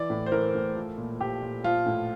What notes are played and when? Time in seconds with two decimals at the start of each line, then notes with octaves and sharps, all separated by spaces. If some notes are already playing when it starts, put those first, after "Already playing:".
Already playing: E3 D5
0.10 A2
0.26 C5
0.32 E3 A#4
0.55 A2
0.76 F3
0.98 A#2
1.20 F3 G4
1.42 A#2
1.64 F3 F4
1.86 A2